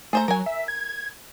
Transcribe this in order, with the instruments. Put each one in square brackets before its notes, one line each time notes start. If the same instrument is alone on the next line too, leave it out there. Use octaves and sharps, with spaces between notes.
[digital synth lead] A3 [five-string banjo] G#4 C5 A#5
[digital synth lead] F#3 [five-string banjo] A#4 G#5
[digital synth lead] E5
G#6